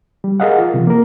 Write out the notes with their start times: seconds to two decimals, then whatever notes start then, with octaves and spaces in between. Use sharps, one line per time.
0.24 G3
0.40 G#4 A#4 D#5 F5 F#5
0.58 F4
0.74 C3 E3 F3
0.87 A#3 A#4